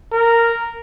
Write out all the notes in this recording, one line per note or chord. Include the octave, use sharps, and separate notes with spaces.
A#4